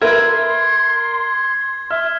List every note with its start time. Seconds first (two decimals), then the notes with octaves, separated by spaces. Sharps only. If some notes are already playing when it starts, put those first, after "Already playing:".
0.02 A#4 B4 E5 C6 G#6
1.91 E5 F6